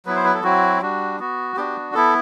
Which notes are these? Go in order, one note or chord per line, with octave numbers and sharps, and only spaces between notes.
F#3 B3 E4 B4
C5
B4
A4
F#3 C4 E4 F#4
G3 D4 F#4
B3 F#4
B3 D4 F#4 G4
B3 E4 A4